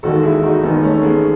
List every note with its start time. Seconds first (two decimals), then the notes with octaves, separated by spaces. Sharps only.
0.03 E1 D#2 D#3 F#4 A4
0.23 E4 G#4
0.43 D#4 F#4
0.63 E1 D#2 D#3 B3 D#4
0.83 A3 C#4
0.94 C#4
1.02 G#3 B3